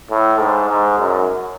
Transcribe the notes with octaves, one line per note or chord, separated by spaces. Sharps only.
A2
G#2
G#2
F#2